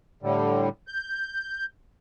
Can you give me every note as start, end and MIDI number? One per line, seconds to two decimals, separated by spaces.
0.23 0.69 45
0.23 0.69 50
0.23 0.69 55
0.87 1.66 91